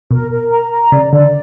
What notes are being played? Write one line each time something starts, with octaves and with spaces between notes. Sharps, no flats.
B2 A#4
A#4
A#5
A#5
C#3 D5
D3 D5